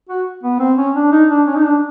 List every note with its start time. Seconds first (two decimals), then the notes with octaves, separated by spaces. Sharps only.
0.09 F#4
0.43 B3
0.60 C4
0.77 C#4
0.95 D4
1.12 D#4
1.30 D4
1.47 C#4
1.56 D#4
1.64 D4